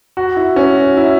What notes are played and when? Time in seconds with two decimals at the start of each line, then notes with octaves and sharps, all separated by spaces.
0.17 F#4
0.36 E4
0.56 C#4
0.76 F#4
0.97 E4